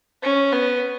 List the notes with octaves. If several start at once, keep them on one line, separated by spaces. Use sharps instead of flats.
C#4
B3